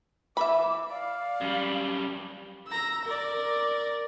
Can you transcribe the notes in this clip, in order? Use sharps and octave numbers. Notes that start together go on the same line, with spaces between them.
E3 E5 B5 D6
D5 F5
F#2 G3
A#5 E6
A#4 D5